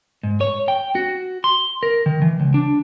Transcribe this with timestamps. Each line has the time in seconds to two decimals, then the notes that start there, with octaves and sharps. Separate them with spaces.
0.23 G#2
0.41 C#5
0.68 G5
0.95 F#4
1.44 C6
1.83 A#4
2.06 D#3
2.22 E3
2.40 C#2
2.54 D4